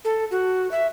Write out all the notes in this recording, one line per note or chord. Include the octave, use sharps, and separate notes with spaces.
A4
F#4
E5